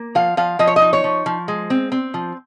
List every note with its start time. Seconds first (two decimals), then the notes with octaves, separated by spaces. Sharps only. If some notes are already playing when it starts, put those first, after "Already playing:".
Already playing: A#3
0.15 F3 F5
0.37 F3 F5
0.59 F3 D#5
0.67 C#5
0.76 D#5
0.82 D#4
0.93 C#5
1.04 F3
1.26 F3
1.48 G#3
1.70 C4
1.92 C4
2.14 F3